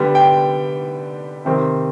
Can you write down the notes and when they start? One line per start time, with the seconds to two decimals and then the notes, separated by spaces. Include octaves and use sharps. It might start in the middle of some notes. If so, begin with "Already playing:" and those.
Already playing: D3 G3 B3
0.15 G5
1.45 C3 D#3 G3 C4